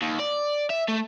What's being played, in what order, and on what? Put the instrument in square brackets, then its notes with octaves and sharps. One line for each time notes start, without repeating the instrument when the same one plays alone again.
[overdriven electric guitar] D#2
D5
E5
A3